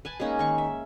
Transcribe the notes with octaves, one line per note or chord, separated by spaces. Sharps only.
B4 G#5 A5
G#3 A#3 C#4 D#4
D#3 C#6
E5